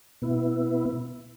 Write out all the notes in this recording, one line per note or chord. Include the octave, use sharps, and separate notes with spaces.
B2 B3 E4